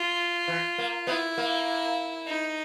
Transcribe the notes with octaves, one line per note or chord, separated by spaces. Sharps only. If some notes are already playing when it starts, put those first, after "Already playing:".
Already playing: F4
E3
A#3
B3 E4
A#3
D#4